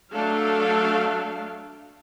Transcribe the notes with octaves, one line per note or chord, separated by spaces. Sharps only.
F#3 A3 D4 A4 F5